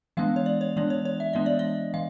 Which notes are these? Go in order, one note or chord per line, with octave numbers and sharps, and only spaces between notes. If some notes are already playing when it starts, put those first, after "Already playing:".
E3 G#3 B3 D4 F5
C#5
D5
C#5
E3 G#3 B3 D4 D5
C#5
C#5
E5
E3 G#3 B3 D4 D#5
D5
D#5
E3 F5